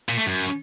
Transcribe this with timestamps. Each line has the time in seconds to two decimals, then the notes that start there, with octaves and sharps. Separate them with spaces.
0.09 A#2
0.17 A3
0.26 F#2